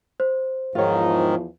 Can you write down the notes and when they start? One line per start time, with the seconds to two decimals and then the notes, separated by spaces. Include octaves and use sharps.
0.20 C5
0.75 E2 G#2 D#3 F3 F4 C#5